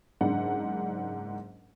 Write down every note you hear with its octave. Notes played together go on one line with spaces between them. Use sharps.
F#1 G#2 D4 F#5